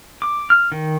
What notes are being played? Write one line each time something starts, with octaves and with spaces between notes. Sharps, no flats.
D6
F6
D#3